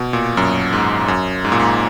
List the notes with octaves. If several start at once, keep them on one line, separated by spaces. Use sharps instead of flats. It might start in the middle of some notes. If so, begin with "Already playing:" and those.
Already playing: B2
A#2
F#2
G#2
F#2
G#2
A#2
G#2